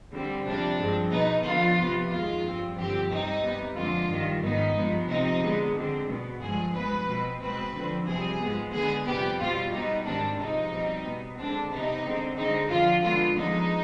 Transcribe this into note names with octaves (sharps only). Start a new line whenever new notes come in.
D3 G3 C4
F2 C3 G3 D4
G2 F3 G#3 C4
B2 B3 D#4
D3 F3 B3 F4
C3 F3 B3
F2 D#3 G#3 F4
G2 F3 C4
G2 D3 F3 C4 G4
C3 G3 C4 D#4
C3 G3 B3
F2 D3 G#3 F4
G2 D#3 G3
G#2 D#3 B3 D#4
G2 F3 G#3 B3
C3 F3 C4 D#4
D3 G#3 B3
D3 G#3 C4
B2 B3
G2 D3 F3 G#3 G#4
G2 F3 G#3 B3 B4
B2 G#3 C4
B2 G#3 C4 B4
D3 F3 C4
F2 C3 G3 C4 G#4
G#2 F3 G#3 B3
D3 G#3 B3 G#4
F2 C3 G3 B3 G4
B2 G3 C4 F4
B2 G3 B3 D#4
G#2 D#3 G3 C4 D4
C3 F3 G#3 D#4
B2 G3 C4
B2 B3
D3 G#3 C4 D4
C3 G3 B3 D#4
D3 G#3 C4
D3 G#3 C4 D#4
F2 D3 F3 F4
D3 G#3 B3 F4
D3 F3 G#3 B3 D#4